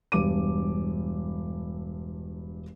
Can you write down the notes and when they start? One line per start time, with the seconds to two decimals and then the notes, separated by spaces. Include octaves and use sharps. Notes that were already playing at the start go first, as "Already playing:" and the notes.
0.12 E1 G2 D6 D#7